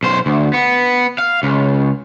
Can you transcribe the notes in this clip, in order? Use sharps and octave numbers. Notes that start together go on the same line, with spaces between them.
B1 C5
D2
B3
F5
C#2